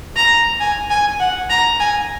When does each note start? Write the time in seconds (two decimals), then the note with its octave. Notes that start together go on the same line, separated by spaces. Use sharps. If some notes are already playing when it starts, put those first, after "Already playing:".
0.16 A#5
0.60 G#5
0.90 G#5
1.20 F#5
1.50 A#5
1.80 G#5